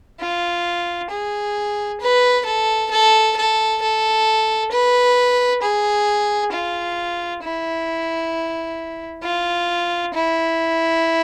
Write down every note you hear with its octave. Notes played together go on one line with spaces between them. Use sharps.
F4
G#4
B4
A4
A4
A4
A4
B4
G#4
F4
E4
F4
E4